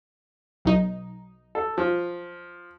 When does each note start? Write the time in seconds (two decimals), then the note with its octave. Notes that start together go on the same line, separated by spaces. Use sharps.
0.65 B1 D#4
1.55 A4
1.78 F3